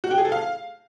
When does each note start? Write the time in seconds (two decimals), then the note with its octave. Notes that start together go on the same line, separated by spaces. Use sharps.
0.04 F#4
0.11 G4
0.18 G#4
0.25 A4
0.32 F5